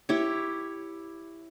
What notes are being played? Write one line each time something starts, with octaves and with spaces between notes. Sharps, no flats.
E4 G4 C#5